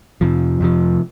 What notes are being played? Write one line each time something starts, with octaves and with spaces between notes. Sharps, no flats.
F2 C3 F3
F2 C3 F3